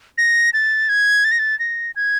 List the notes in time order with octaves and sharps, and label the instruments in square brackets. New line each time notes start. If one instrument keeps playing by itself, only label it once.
[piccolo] A#6
A6
G#6
A6
A#6
A6
A#6
G#6